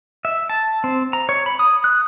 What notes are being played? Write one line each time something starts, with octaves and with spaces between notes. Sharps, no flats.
E5
A5
C4
A#5
C#5
B5
D#6
F#6